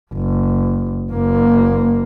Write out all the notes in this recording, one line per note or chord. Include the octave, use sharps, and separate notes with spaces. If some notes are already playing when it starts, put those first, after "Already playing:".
F#1
F#1 A#3